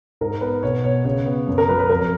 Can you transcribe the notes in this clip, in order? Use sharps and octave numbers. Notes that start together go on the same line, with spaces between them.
G#2 A#4
B3 B4
B2 C#5
B3 C#5
C#3 C#5
B3
F#2
A#4
F#3 B4
B4
F2 A#4